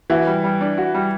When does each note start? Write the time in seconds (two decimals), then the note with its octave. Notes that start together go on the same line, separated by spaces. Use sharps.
0.10 E3 E4 F#4
0.26 G3
0.44 G3
0.61 D4
0.78 F#4
0.94 G3